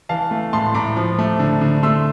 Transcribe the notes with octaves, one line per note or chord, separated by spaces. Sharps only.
E3 F5 A5
A3
A2 A5 C6
A2 A#5 D6
F3
A3
D3
D3
A3 C6 E6